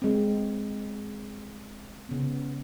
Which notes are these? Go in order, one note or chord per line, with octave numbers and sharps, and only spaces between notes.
G#3 C4
C#3 B3